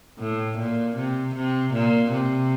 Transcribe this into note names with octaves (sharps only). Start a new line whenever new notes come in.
A2
A#2
C3
C3
A#2
C3